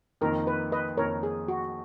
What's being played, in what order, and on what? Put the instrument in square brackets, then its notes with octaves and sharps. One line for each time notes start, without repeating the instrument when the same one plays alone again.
[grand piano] F2 D#3 A#3 D#4 [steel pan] A#4
[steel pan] B4
B4 D#5
[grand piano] F2 D#3 A#3 D#4 [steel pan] A#4 C#5
[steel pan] G#4
F#4